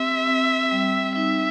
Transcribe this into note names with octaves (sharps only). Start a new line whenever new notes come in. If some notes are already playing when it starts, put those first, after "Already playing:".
Already playing: C4 G4 E5
C4
G3
D#4 E5